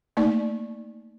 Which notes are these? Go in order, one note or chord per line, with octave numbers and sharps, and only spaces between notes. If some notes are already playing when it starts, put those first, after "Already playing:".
A3 A#3 D#4 D5